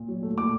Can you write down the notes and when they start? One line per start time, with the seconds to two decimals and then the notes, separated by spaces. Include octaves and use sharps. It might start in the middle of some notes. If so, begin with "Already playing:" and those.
Already playing: A#2
0.08 F#3
0.23 A3
0.37 A#2 D6